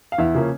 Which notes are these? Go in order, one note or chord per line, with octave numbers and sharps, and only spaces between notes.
F5
E2 E4 E5
C#3 F3 A#3 C#4